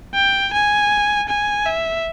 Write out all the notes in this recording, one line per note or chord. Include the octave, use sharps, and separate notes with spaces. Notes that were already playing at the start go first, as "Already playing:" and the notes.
G5
G#5
G#5
E5